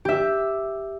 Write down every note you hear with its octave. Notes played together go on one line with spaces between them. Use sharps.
G4 E5